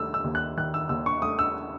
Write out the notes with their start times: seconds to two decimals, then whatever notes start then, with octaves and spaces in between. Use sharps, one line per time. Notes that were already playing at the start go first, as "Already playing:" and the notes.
Already playing: D#2 A3 E6
0.14 E6
0.24 D#2
0.35 F#6
0.57 D#3 F#6
0.74 E6
0.89 D#2 E6
1.06 C#6
1.22 A3 D#6
1.39 E6